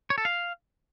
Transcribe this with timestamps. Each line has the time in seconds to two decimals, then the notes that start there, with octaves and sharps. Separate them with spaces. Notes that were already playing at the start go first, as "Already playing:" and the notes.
0.10 C#5
0.18 A4
0.25 F5